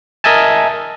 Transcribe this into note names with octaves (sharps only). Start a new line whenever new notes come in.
A#4 D#5 E5 G#5 A5